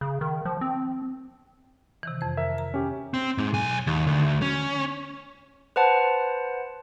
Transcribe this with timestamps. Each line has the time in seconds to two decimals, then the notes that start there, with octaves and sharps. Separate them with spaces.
0.01 C#3
0.21 D#3
0.45 F3
0.61 C4
2.03 C3 D#3 E3
2.21 F2 C5
2.37 A#4 E5
2.58 A#5
2.74 C#4 G4
3.14 C4
3.38 G#2
3.54 B1 G#5
3.87 D#2
4.07 D2
4.42 C#4
5.76 B4 C5 F#5 A5